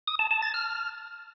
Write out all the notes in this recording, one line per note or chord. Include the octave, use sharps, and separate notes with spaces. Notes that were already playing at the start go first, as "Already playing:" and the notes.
D#6
A5
A5
A6
F6